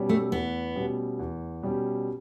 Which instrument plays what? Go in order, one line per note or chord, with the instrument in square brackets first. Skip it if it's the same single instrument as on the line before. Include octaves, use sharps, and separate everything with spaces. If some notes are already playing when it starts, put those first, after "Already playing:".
Already playing: [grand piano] B2 G3 C#4 G4
[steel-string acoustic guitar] A3
[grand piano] E2 [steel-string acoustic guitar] B3
[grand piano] B2 G3 C#4 G4
E2
B2 G3 C#4 G4